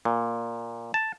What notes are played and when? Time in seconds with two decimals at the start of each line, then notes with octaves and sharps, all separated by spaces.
0.05 A#2
0.94 A5